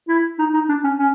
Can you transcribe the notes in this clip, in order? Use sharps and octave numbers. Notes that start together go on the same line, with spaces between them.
E4
D#4
D#4
D4
C#4
C#4